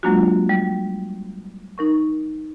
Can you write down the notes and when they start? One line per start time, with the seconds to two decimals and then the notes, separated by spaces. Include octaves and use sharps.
0.03 F#3 G#3 A#3 D4 F4 F#4
0.49 G3
1.78 D#4 A#4 C#6